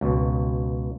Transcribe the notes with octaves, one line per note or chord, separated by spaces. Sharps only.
C#2 B2